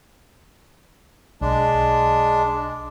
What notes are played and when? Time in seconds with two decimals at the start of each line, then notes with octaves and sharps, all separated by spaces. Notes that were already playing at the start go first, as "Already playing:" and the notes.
1.41 B1 G#3 D4